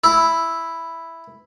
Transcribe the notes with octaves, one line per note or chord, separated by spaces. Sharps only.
E4